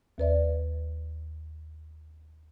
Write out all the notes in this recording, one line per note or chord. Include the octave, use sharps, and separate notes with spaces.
D#2 B4 D5 E5